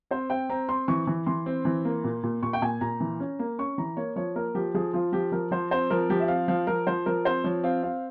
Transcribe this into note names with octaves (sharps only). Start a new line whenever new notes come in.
C4 C5
C4 G5
C4 A#5
C4 C6
E3 C#6
E3
E3 C6
C4
E3
A#3
A#2
A#2
A#2 C#6
G5
A#2 G#5
A#2 A#5
E3
C#4
A#3
C#4 C#6
E3 A#5
A#3 C#5
F3 C#5
A#3 A#4
F3 G4
F3 G#4
F3 F4
F3 G4
F3 A#4
F3 C5
C4 C5
F3 A#4
F3 G4
E5
C4 F5
F3 F5
F3 A#4
F3 C5
F3 A#4
C4 C5
F3 C#5
C4 F5
C4 F5